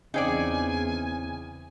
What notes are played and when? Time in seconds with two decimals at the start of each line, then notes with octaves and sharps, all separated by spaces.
0.14 E2 C#3 C4 D#4 G#4 D5 G#5